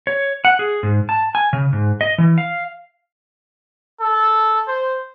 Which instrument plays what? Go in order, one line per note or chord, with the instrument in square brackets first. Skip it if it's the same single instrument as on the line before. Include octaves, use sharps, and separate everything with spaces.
[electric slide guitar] C#5
F#5
G#4
G#2
A5
G#5
C#3
G#2
D#5
E3
F5
[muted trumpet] A4
C5